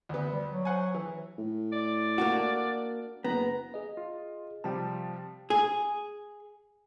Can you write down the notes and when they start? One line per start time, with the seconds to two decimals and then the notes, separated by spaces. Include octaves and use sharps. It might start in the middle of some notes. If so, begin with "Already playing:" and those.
0.09 D2 B3
0.30 G3
0.52 F#3
0.65 C5 F#5 G#5
0.94 E3
1.38 A2
1.72 D5
2.18 A#3 D4 F#4
3.24 F#1 B3 A#5
3.74 G#4 D#5
3.97 F4
4.64 C3 F3 G3 G5 A5
5.50 G#4